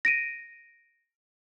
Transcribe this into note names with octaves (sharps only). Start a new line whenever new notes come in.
A#6 D7 D#7